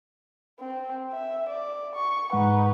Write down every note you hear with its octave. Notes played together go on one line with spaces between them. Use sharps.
C4
E5
D5
C#6
G#2 G#3 D#4 B4 F#5